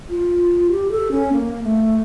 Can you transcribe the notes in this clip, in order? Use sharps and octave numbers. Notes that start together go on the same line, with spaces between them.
F4
G4
A4
C#4
A#3
A3